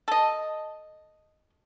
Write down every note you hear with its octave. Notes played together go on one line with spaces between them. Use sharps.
A4 D#5